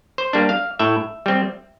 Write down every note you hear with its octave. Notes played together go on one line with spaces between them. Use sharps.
C5
G3 A#3 D4
F5
A2 E5
G3 C4